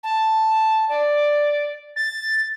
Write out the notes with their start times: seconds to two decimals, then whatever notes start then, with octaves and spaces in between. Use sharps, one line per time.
0.03 A5
0.89 D5
1.96 A6